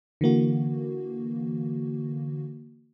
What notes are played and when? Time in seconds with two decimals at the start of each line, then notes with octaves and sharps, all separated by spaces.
0.21 D3 E3 A#3 F#4